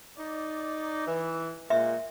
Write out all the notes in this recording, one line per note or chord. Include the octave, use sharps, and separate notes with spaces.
D#4 D5
E3
A#2 G#3 E5